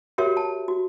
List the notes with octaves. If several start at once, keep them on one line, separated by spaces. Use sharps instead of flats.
F#4 G4 A#4 C#5 E5
A5
F#4